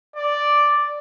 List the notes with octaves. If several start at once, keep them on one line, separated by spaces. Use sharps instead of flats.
D5